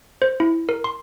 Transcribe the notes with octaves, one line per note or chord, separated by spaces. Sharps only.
C5
E4
A#4
C6